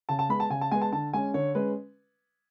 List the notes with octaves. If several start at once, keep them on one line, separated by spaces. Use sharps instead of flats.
C#3 A5
A5
G#3 B3 B5
A5
C#3 G#5
A5
G#3 B3 G#5
A5
D3 A5
G#3 C#4 G#5
D3 C#5
G#3 C#4 B4